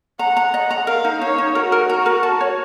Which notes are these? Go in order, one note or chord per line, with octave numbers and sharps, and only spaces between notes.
F#5 A#5
A#5
D#5
A#5
A#4 F5
D#4
D#4 C#5
D#4
F#4 A#4
A#4
A#5
A#4
A5
C#5